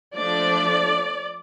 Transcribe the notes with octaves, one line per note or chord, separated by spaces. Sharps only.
F3 A3 D4 D5